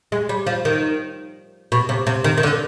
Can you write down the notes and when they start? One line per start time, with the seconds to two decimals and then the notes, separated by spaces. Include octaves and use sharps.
0.12 G#3
0.29 G3
0.47 F3
0.65 D#3
1.72 B2
1.89 C3
2.07 C3
2.24 D#3
2.38 D#3
2.43 D3